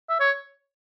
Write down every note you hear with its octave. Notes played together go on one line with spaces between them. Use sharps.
E5
C#5